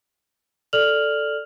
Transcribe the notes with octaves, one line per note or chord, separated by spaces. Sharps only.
A4 D5 F6 F7 F#7